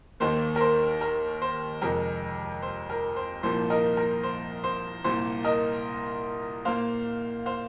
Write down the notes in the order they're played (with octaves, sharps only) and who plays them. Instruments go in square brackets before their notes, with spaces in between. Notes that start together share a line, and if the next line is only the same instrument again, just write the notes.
[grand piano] D#2 D#3 A#3 C5
A#4
C5
A#4
C5
F2 C3 G#3 A#4
C5
A#4
C5
C2 A#2 F3 A#3 C5
A#4 D#5
A#4
C5
C5
C2 A#2 A#3 C5
A#4 D#5
A#2 A#3 C5 F5
C5 F5